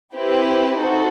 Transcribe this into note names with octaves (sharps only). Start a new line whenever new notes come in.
C4 E4 G4 B4
D#4 F#4 A4 C5